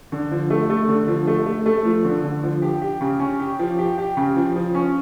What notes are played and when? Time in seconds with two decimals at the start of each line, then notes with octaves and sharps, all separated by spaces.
0.12 D3
0.31 F3
0.50 A3
0.70 A3
0.88 D3
1.08 F3
1.27 A3
1.46 A3
1.66 A3
1.85 F3
2.05 D3
2.24 D3
2.43 F3
2.62 G4
2.82 G4
3.01 C#3
3.20 C#4
3.40 G4
3.59 F3
3.79 G4
3.98 G4
4.17 C#3
4.37 F3
4.55 F3
4.75 C#4